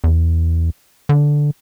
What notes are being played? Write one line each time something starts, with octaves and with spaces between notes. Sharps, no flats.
E2
D3